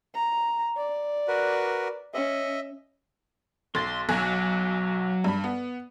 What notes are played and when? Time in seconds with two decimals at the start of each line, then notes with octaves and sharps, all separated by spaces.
0.15 A#5
0.77 D5
1.28 F#4 A#4 B4
2.14 C#4 D#5 E5
3.75 B1 C6 A6
4.09 B1 F#3 G#5 F#6
5.24 G2 B5
5.44 B3